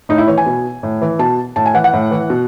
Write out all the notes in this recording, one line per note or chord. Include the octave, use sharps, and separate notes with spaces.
A2 D#4
E4
E3 C#5
G#5
B2
A2
E3
B2 A5
A2 A5
G#5
E3 F#5
F#5
A2
E3
B2